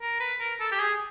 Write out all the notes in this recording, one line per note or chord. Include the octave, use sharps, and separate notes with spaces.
A#4
B4
A#4
A4
G4
G#4